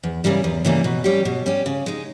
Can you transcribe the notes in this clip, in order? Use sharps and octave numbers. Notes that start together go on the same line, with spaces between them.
E2
C#3 E3 G3 A#3
E2
C#3 E3 G3 A#3
B2
G3 C#4 G4
B2
G3 C#4 G4
C#3
G#3 D#4